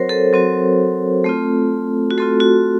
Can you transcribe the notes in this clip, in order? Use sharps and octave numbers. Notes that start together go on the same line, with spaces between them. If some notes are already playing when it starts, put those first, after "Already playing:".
Already playing: F#3 C4 F#4 A#4 C5 C#5
A4
F#3 C4 F#4
A3 C4 F4
F#4
A3 C4 F4 A4
F#4